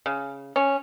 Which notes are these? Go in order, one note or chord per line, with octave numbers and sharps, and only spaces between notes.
C#3
C#4